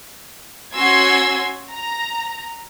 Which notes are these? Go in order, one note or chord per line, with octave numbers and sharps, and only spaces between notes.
C#4 F#4 G#5 C6 E6 G#6
A#5